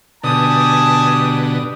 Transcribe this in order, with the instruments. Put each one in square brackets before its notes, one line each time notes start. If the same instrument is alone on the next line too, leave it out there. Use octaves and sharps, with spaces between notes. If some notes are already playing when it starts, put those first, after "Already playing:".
[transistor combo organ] B2 D3 [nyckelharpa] G4 D#6 [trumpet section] G#5 A5